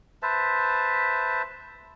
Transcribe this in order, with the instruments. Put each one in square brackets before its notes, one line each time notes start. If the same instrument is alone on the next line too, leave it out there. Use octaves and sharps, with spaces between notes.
[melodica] B4 C5 E5 A5